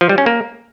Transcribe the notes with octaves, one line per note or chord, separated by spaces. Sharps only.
F3
G3
C#4
A#3